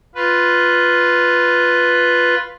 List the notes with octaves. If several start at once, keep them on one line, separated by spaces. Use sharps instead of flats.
F4 B4